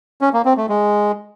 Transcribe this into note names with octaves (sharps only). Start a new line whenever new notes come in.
C#4
A#3
C4
A3
G#3